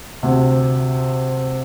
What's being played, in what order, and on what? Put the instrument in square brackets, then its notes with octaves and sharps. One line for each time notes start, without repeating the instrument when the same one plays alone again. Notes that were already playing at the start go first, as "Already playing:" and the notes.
[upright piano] D2 C3